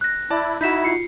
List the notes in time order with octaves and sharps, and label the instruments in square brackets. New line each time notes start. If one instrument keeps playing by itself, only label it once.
[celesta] F#6 A#6
[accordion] E4 [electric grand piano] D5 A5
[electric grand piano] D#4 F#4 [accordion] E4 [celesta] G6 B6 E7
[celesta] F4 C7 C#7